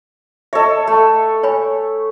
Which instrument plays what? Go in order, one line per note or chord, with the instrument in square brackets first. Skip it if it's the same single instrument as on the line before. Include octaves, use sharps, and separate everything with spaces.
[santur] A4 C#5 [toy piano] D#5 E5
[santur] A3
[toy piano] C#5 G#5 B5